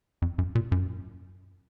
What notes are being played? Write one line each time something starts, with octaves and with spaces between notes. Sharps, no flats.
F2
F#2
A#2
F#2